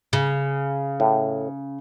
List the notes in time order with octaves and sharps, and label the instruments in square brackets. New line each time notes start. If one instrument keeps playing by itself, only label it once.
[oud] C#3
[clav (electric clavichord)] A2